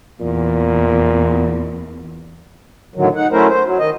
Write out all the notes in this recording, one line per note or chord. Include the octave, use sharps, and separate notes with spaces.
E2 A#2
A2 D3 D#3 F#3
D#4 F#5
F#3 A3 C#4 E4 A#4 C5
C5
F#3
D#3 D#5